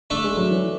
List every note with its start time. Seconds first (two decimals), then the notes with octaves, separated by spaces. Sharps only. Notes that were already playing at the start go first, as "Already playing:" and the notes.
0.10 D3 A3 D4 A4
0.24 G#3
0.37 F#3
0.50 E3